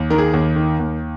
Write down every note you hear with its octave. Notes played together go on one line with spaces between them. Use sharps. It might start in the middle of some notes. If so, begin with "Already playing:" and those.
Already playing: D#2
D#3 A#4
G#4
D#2
D#3
D#2